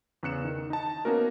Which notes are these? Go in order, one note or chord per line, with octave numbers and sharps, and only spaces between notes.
E2 C#3 F#6 C#7 E7
D#3
D#4 A5
A#3 B3 C#4 D#4 F#4 A#4